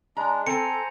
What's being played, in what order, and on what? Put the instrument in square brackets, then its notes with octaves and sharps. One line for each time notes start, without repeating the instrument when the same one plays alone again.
[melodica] G#3 D4 [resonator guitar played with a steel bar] A#5
[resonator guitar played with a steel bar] C4 [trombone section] A4 [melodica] C5 G#5 A#5 [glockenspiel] C#7